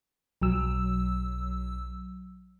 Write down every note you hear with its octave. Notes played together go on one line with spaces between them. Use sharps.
B1 F#3 E6